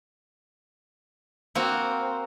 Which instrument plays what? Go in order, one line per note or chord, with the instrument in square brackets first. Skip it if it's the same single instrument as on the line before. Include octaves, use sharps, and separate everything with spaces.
[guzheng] A#3 C4 F#4